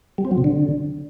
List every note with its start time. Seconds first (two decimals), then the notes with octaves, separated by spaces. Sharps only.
0.18 G3
0.25 C4
0.31 F#3
0.38 C3
0.44 D3